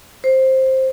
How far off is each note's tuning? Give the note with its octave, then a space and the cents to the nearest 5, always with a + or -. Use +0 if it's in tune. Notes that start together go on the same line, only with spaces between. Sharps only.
C5 +10